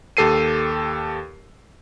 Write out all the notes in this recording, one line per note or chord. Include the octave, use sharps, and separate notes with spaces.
D#2 G4 A4 C7 D#7